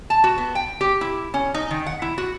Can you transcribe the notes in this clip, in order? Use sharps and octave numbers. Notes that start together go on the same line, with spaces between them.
A5
F#4
B3
G5
G4
E4
C#4
D#4
D#3
F#5
E4
F#4